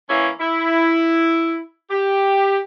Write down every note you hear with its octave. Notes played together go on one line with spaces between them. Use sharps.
E3 A#3 C#4 E4
E4
G4